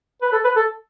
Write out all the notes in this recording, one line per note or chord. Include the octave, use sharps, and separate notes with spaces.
B4
A4
B4
A4